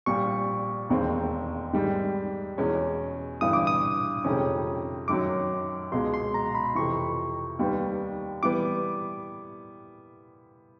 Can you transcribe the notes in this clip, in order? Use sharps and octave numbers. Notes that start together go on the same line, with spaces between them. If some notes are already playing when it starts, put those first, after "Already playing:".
A#1 A#2 G3 C#6
E1 D#2 D#3 G#3 C4
G#2 D#3 G3
E2 B2 G#3 C#4
G1 G2 E3 D#6
D6
D#6
F2 C3 D#3 G#3 C#4
F#2 D#3 F#3 D6
C#2 B2 G#3 C6
C6
A#5
B5
F2 C3 E3 C#6
D#2 D#3 G3 B3
E3 G3 B3 D6